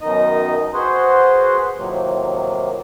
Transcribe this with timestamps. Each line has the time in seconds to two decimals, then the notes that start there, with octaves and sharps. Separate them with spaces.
0.01 F#2 B2 D#3 D#4 D#5 D#6
0.74 F#4 G#4 B4 C5 F#5 C6
1.78 A2 C3 D#3 F3 F#3 A#3